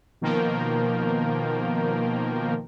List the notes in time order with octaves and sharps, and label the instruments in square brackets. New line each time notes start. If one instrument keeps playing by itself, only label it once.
[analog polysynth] B2 D#3 F3 A#3 A#4 G5